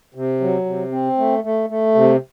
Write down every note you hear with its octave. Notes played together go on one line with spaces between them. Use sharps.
C3
F#3
C3
C4
A3
A3
A3
C3